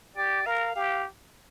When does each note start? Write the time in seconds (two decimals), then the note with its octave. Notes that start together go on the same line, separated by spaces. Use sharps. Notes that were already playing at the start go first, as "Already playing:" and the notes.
0.16 G4 D5
0.46 A#4 F5
0.75 G4 F5